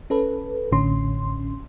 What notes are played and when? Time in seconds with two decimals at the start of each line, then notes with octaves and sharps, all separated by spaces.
0.10 C#4 A4 B4
0.72 A1 A2 D3 C#4 C6